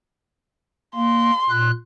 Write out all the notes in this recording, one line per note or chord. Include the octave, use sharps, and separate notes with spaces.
A#3 C6
A#2 F#6